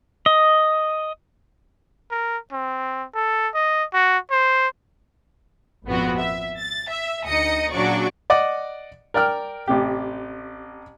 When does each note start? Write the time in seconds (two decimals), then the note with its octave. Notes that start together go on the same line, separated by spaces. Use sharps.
0.26 D#5
2.11 A#4
2.52 C4
3.15 A4
3.54 D#5
3.94 F#4
4.31 C5
5.86 G#1 F2 A#2 B3 C4 F#4
6.19 E5
6.59 A6
6.90 E5
7.27 D2 D#4 D#5 D#6 A#6 C#7
7.73 A#2 C#3 F#3 D4 D5 C#6
8.30 D5 D#5 F#5 D6
9.14 A#4 D5 G5 F6
9.68 A1 C3 G4